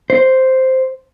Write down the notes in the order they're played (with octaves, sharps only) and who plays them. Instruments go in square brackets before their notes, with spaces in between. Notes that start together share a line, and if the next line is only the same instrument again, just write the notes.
[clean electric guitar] C5